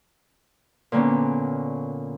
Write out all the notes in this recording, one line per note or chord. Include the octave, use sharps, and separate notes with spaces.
A#2 D3 A#3 B3 C#4